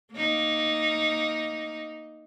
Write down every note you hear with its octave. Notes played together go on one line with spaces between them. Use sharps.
A#3 D#4